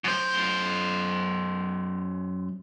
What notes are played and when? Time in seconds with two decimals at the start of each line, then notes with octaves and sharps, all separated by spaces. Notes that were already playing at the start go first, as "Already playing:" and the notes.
0.04 F#2 C5